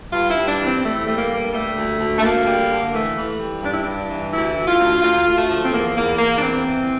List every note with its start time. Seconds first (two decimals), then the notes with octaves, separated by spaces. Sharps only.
0.13 G2 F4
0.30 E4
0.36 G2
0.48 D4
0.60 E3
0.65 C4
0.82 E3 A3
1.06 G3 A3
1.17 A#3
1.29 G2
1.52 G3 A3
1.76 D2
2.00 D2
2.18 A3
2.22 D2 A#3
2.46 G3
2.69 D3
2.93 E3 A3
3.16 E3
3.39 G3
3.62 G2 D4
3.72 E4
3.81 G2 D4
4.09 E3
4.32 D2 E4
4.56 D2
4.68 F4
4.79 D2
5.02 D2 F4
5.26 D2
5.38 A3
5.49 F3
5.63 C4
5.72 E2 A#3
5.95 E2 A#3
6.19 E2 A#3
6.37 D4
6.42 E3 C4
6.66 E3